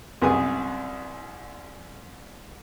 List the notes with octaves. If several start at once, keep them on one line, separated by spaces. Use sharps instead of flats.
C2 F#2 B3 G#4 D#6